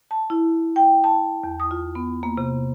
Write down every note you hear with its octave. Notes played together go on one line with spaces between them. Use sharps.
A5
E4
G5
A5
E2
D#6
F4
B3
A#3
C3